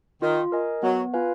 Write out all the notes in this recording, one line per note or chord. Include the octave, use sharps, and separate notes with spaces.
D#3 F4
A#4 D#5 G#5
F#3 B3
F4 B4 F5 G#5